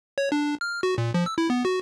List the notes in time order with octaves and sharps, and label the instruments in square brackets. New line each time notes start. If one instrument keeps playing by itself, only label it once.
[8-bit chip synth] C#5
D4
F6
F#4
A#2
F3
E6
E4
B3
F#4